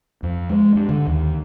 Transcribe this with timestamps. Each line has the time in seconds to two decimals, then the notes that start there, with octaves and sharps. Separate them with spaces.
0.23 F2
0.49 G#3
0.75 G2
0.89 D3
1.07 D#2